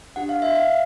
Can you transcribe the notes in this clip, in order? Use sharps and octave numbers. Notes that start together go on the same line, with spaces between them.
D4 G4 F#5
F5
E5
F5